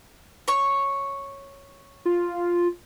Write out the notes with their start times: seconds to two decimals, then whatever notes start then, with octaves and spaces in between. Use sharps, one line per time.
0.48 C#5 C#6
2.06 F4